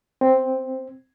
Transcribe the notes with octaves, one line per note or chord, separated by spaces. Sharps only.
C4